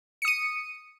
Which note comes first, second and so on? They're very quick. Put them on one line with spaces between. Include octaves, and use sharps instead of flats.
C#7 D#6 D#7